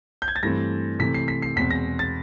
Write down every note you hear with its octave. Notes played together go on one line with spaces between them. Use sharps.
G6
G#6
A6
G2 E3 A3 C4 A#6
C3 E3 A3 C4 B6
C7
B6
C7
E2 B2 G#3 C4 B6
A#6
A6